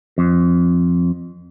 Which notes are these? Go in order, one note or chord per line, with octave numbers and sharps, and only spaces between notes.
F2